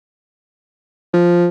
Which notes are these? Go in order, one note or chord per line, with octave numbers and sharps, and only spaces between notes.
F3